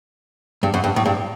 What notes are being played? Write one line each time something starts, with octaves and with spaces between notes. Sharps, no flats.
G2
F#2
G2
A2
G2